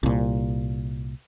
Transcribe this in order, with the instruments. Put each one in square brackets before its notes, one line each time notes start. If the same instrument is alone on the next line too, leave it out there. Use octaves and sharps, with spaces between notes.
[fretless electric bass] C2 A#2